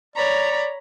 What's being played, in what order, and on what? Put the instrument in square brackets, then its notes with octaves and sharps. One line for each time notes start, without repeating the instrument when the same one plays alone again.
[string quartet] C#5 A#5 B5 [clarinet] D5